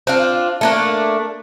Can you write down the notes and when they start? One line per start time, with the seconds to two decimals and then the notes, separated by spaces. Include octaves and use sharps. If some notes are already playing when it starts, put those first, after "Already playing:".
0.07 C4 D4 F4
0.61 A3 A#3 D4